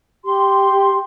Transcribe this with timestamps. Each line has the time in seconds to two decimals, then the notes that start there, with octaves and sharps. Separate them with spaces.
0.24 G4 C6